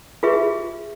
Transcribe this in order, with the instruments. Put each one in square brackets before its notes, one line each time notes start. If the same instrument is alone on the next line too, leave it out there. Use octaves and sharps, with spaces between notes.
[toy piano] F4 G4 G#4 B4 E5